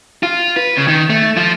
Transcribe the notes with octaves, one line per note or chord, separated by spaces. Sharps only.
F4
B4
C#3
D#3
A3
F3